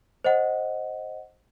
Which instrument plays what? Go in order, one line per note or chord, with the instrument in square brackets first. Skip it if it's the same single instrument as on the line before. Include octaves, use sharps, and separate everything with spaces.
[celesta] C5 D#5 F#5